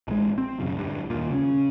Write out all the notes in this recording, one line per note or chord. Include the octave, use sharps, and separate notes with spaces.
A1 G#3
C4
E1 F#2 C#3
D1 G2
D#2 A#2
C#3 F#3 C#4